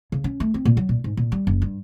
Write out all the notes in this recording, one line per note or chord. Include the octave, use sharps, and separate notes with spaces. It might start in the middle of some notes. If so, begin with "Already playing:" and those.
C#3
C#4
A3
C4
A#2
F#3
A#2
G#2
A#2
G3
F#1
G2